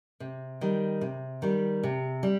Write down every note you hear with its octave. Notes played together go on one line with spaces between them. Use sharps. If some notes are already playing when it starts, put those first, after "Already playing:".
C3
D#3 G3
C3
D#3 G3
C3
G3